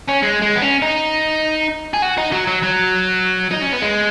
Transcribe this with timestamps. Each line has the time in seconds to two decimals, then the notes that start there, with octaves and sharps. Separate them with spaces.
0.08 C#4
0.22 G#3
0.42 G#3
0.56 B3
0.62 C#4
0.82 D#4
1.93 G#4
2.02 F#4
2.18 D#4
2.32 F#3
2.47 F#3
2.63 F#3
3.51 D#4
3.62 C#4
3.72 B3
3.82 G#3